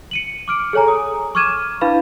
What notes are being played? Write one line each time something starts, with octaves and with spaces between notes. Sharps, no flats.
C#7 D#7 F#7
D6 F6 D7
G#4 A4 C#5 G#5 A#5
D#6
C#6 D6 F6 G#6 D#7 E7
D4 E4 B4 F5 B5